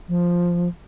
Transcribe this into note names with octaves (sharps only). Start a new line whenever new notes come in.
F3